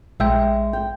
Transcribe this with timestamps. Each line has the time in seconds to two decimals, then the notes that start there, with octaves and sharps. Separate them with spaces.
0.20 A#1 G#3 E5 G5
0.73 G5